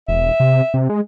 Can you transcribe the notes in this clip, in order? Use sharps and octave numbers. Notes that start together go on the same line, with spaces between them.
E1 E5
C3
C3
G#3